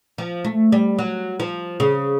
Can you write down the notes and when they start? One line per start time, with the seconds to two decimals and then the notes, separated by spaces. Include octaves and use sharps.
0.18 F3
0.44 A3
0.72 G3
0.99 F#3
1.40 F3
1.80 C#3